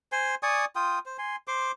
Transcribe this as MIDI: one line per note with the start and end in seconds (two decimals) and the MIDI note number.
0.12 0.35 72
0.12 0.35 80
0.12 0.35 84
0.43 0.65 74
0.43 0.65 80
0.43 0.65 85
0.43 0.65 87
0.76 0.99 65
0.76 0.99 79
0.76 0.99 87
1.06 1.17 72
1.18 1.36 80
1.18 1.36 84
1.48 1.72 72
1.48 1.72 84
1.48 1.72 86